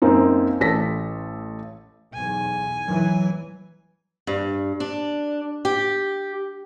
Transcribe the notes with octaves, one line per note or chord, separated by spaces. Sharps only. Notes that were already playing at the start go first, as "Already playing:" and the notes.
F#2 A#3 C4 D#4
A1 A4 A#6 B6
B1 E2 G#5
E3 F#3
G2
D4
G4